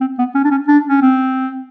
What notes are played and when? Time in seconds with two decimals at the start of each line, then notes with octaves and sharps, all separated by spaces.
0.01 C4
0.18 B3
0.35 C#4
0.44 D4
0.51 C#4
0.68 D4
0.88 C#4
1.02 C4